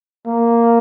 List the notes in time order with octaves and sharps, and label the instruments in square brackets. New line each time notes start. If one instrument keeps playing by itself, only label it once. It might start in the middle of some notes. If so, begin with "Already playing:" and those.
[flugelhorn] A#3